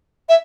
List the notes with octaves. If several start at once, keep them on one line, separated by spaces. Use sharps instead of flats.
E5